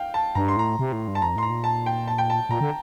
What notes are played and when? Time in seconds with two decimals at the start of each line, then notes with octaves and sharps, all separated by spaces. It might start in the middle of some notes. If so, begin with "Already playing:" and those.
Already playing: F5 G5
0.14 A5
0.35 G2 A#5
0.48 C6
0.57 A2 A#5
0.79 C3
0.92 A2
1.08 G2
1.15 A5
1.22 F2 A#5
1.36 A2 C6
1.43 A#5
1.50 A#2
1.64 A5
1.86 G5
2.08 A5
2.18 G5
2.30 A5
2.49 A#2 A#5
2.61 D3